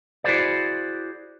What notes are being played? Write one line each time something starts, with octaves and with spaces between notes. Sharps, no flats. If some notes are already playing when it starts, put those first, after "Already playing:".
E4 F#4 G#4 C5 D5